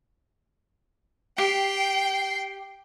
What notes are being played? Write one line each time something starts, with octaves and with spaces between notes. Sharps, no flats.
G4 G5 C7